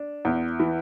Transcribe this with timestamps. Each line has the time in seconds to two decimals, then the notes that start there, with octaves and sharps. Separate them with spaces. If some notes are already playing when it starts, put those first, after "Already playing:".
Already playing: D4
0.25 E2
0.60 E3